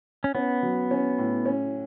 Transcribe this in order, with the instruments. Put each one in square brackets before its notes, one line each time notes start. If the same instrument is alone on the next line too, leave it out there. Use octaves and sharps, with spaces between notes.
[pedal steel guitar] C#4
[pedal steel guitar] B3 [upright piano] C#4
[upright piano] F#3
C#4
A2
C#4